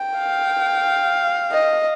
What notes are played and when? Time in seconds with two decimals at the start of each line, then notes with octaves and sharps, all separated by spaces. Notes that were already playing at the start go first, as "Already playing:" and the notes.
Already playing: G5
0.18 F5
1.51 D#5